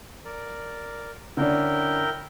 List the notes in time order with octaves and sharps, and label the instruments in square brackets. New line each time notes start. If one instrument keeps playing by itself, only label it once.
[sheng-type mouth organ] A#4 D5
[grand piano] D3 C#4 D4 [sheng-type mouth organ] E4 A#4 G5